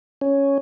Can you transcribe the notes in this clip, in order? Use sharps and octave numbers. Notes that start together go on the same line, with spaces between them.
C#4